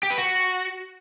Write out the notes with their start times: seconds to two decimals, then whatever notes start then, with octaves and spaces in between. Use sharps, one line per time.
0.03 G4
0.10 B4
0.18 F#4